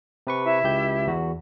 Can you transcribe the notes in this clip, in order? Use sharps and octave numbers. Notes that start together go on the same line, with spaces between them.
C3 B4 C#6
E4 E5
C#2 G4 G6
E2 F#4